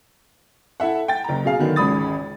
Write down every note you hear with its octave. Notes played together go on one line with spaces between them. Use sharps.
E4 A4 E5 F#5
G5 A6
F#1 A#5
B2 G#4 F5
D3 D#3 F#3 B3
G#1 C#2 C#3 B5 D#6 A6